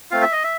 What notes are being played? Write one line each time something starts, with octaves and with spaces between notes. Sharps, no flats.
A3 C4 F4 F5
E5
D#5
E5